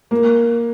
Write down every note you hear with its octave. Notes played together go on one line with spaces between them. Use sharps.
A#3